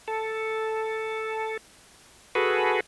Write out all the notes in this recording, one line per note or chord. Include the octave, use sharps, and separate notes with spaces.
A4
F#4 G#4 A4 B4